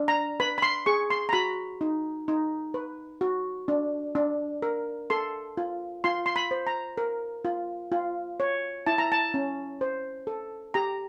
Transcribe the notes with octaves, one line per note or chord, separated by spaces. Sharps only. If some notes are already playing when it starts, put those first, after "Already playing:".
Already playing: D4
A#5
B4 B5
B5
C6
G#4 C#6
C6
A#5
F#4 B5
D#4
D#4
B4
F#4
D4
D4
A#4
A4 C6
F4
F4 C6
C6
B5
C5
A#5
A#4
F4
F4
C#5
E4 A5
A#5
A5
C#4
C5
A4
G4 A#5